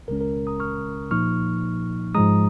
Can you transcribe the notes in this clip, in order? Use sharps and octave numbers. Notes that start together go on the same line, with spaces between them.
C#2 C#3 G#3 C#4 A#4
A#4
A#5 D#6
C#6 F6
A#2 F3 A#3 D#4 C#6 F6
G#2 F3 G#3 A#5 D#6